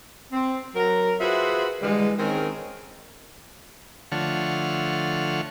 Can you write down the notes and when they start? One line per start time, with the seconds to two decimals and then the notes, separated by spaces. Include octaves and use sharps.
0.33 C4
0.75 F#3 A#4
1.20 F4 F#4 G#4 B4 C5 E5
1.82 D3 E3 G3 G#3
2.18 D#3 G#3 C4 C#4 A#4
4.12 D3 F3 A3 C#5 F#5 F6